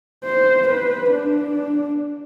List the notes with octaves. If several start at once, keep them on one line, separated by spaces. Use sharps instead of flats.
C5
B4
D4